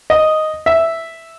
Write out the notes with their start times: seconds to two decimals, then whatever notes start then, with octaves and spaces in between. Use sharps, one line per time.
0.10 D#5
0.66 E5